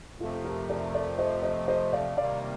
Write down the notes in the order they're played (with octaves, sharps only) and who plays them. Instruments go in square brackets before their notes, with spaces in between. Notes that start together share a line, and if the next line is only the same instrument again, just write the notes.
[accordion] F2 C3 F3 A3 [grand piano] F4 A4
[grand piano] G4 A#4
A#4 D5
A#4 D5
C5 D#5
C5 D#5
C5 D#5
D5 F5
[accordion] C3 D#3 G3 A#3 [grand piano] D5 F5